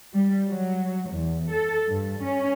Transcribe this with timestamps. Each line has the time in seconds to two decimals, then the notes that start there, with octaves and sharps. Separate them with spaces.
0.13 G3
0.49 F#3
1.11 E2
1.52 A4
1.88 G2
2.22 C#4